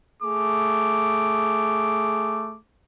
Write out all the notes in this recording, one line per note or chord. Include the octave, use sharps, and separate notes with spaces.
A3 G#4 D6